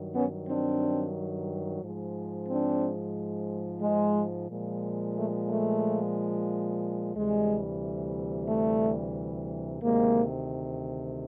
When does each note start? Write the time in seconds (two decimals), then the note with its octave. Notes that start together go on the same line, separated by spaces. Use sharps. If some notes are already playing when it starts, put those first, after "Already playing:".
Already playing: G2 D#3 F#3
0.15 B3 C#4
0.48 C4 D4
1.81 G#2 F3 G#3
2.48 C4 D4
3.81 G#3
4.49 A#2 F3 G#3
5.15 A3
5.48 A3
7.15 D2 C3 E3 G3 G#3
8.48 A3
9.82 D2 C3 D#3 G#3 A#3